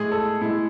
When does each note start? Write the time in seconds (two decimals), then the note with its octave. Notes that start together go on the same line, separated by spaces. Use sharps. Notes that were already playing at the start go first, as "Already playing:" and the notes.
Already playing: A2 G#3 G#4
0.12 A4
0.41 A2 G#3 E4